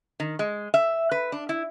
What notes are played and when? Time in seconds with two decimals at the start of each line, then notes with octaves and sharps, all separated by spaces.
0.20 D#3
0.39 G#3
0.74 E5
1.11 B4
1.32 D4
1.49 E4